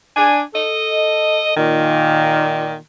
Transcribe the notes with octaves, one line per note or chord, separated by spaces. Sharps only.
D4 G#5
A4 D#5
A#2 D#3